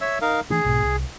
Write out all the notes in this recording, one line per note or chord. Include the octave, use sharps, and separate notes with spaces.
C#5 E5 E6
D#4 A#4 F5
E3 A3 D4 G#4
B1 G#2 B2
C2